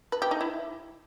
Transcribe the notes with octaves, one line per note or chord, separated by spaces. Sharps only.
B4
G4
D#4
E4